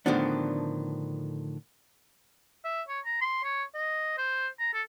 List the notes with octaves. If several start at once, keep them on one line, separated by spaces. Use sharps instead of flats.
A2 D3 D#3 F3 B3 D4
E5
C#5
A#5
C6
C#5
D#5
C5
A#5
A4